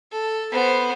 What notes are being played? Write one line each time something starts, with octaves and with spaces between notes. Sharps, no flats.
A4
B3 C5